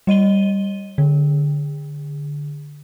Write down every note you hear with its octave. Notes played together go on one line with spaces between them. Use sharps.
G3 D#5 D#7 G7
D3